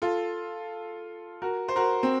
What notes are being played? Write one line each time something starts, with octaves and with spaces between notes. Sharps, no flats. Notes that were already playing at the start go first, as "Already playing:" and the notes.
F4 A4
F#4 A#4
C5
F#4 A#4
C4